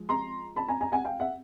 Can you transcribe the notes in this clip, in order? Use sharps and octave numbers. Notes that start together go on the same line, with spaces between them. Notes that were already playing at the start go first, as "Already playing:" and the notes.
Already playing: F3 G#3
A#5 C6
A5 B5
G#5 A#5
G#5 A#5
F#5 G#5
F5 G5
E5 F#5